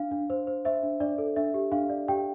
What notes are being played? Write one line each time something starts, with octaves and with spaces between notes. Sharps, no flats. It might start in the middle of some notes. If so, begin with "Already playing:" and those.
Already playing: D4 F5
D4
C5
C5
C5 E5
D4
D4 D5
A4
D4 E5
G4
D4 F5
D5
G4 G5